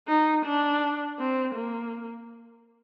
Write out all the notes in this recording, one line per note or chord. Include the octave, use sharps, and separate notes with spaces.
D#4
D4
C4
A#3